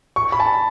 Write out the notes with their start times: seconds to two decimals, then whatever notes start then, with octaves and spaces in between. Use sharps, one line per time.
0.16 C#6
0.32 B5
0.40 A5